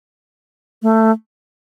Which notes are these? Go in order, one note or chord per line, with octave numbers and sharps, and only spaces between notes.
A3